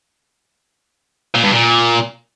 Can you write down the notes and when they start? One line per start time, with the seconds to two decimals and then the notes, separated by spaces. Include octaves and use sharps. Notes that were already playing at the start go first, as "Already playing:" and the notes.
1.35 A#2
1.44 G2
1.52 A#2